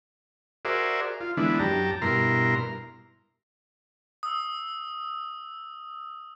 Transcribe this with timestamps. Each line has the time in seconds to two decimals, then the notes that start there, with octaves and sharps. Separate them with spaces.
0.65 F#4 G#4 A#4 C5 D5 E5
1.21 F4
1.37 D3 E3 G#3 B3 D4 E4
1.59 F#2 G4 A5 A#5
2.02 G2 B2 E4 A#4 A#5 C6
4.23 D#6 E6